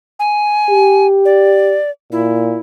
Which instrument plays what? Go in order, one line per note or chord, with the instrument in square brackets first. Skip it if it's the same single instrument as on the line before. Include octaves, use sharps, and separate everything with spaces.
[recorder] G#5
[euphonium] G4
[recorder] D5
[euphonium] A#2 [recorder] E4